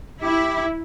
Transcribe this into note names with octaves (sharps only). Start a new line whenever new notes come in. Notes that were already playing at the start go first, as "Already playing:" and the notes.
E4 G4